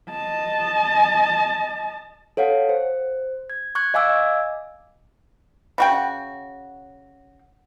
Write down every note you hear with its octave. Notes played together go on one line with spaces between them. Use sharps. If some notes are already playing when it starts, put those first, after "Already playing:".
D#5 A5
A4 C#5 F5 F#5
C5
G#6
C#6 F#6 G#6
D#5 F5 G#5 D6 E6 G#6
C#3 F#4 G5